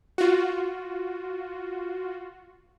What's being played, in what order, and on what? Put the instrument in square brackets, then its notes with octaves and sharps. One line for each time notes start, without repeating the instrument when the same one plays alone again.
[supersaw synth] F4 F#4